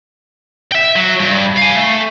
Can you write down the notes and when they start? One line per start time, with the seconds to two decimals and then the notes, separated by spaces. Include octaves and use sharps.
0.72 E5 G5
0.96 F#3
1.20 G2
1.58 F5 G#5
1.76 A3